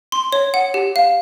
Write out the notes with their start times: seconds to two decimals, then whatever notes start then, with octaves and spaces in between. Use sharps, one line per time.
0.12 C6
0.32 C#5
0.54 F#5
0.74 G4
0.96 F5